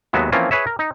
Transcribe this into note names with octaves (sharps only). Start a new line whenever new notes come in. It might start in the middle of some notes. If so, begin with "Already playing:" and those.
D#2 F#3 G#3 B3 E5
E3 F3 A#3 C4 C#4 F4
G#4 B4 C#5 E5
A#4
D#4